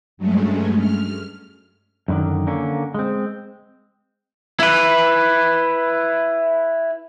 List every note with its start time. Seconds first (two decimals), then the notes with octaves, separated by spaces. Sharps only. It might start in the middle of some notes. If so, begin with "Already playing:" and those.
0.17 G2 F#3 G#3 A3 C#4
0.79 F6
2.08 F#2 A2 D3 D#3
2.47 D3 A#3 C#4
2.94 G#3 C4
4.60 E4 B4